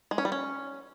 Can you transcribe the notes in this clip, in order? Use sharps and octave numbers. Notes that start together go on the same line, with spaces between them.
G#3
C#4
G3
C#4